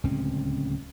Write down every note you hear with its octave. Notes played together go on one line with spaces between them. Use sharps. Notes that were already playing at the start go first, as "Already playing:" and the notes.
D1 C#2 C4 C#4